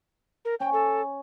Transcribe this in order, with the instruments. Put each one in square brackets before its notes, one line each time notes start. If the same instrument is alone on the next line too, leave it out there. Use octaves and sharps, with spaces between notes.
[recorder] A#4
[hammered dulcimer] C#4 [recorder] G5
[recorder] A4